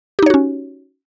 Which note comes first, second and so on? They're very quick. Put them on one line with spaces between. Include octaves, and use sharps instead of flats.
G4 D#4 C#5 F#4 C#4